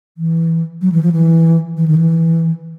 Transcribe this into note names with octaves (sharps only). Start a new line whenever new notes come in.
E3
F#3
E3
F3
E3
E3
D#3
E3